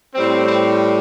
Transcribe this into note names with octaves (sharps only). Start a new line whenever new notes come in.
A2 G3 C4
C4